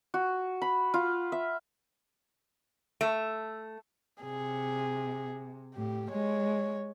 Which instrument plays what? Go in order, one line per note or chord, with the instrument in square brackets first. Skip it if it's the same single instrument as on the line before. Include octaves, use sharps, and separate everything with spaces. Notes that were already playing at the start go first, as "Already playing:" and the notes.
[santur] F#4
B5
F4
E5
[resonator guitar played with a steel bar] A3
[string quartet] C3 [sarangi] G#4
[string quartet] A2 [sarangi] G4
[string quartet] G#3 [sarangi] C#5